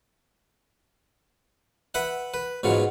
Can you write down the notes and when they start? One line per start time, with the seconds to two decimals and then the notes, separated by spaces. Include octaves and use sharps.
1.94 B4 E5 F#5
2.34 B4
2.63 G#2 B2 F#3 F4